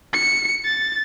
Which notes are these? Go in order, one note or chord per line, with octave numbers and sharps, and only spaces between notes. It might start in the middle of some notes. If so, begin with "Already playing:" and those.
C#7
A6